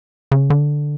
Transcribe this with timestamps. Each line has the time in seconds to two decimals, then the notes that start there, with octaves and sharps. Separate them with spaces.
0.32 C#3
0.50 D3